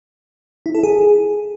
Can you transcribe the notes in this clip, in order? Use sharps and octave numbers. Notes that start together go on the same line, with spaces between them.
E4
A4
G#4